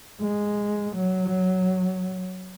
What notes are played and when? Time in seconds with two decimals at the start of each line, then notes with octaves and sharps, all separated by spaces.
0.21 G#3
0.96 F#3